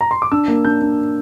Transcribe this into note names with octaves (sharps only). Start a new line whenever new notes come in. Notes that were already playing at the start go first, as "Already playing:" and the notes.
A#5
C6
D6
D4 E6
A#3
D4 G6
D4